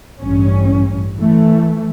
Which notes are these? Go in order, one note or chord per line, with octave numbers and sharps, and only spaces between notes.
A1 G2 C#4
E3 A3